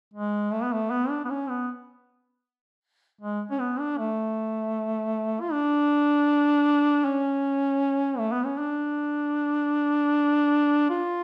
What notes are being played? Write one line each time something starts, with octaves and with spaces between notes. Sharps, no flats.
G#3
A3
B3
A3
B3
D4
B3
C#4
B3
G#3
C#4
B3
D4
A3
F4
D4
C#4
A3
B3
C#4
D4
F4